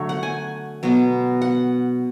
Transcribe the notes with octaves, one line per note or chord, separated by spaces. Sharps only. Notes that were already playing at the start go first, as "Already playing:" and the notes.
Already playing: D3 F#3 A3 C#5
F#5
G#5
B2 F#3 B3
F#5